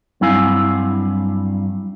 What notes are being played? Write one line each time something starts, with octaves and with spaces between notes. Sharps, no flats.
G2 F#3 C4 E4 F5 G#5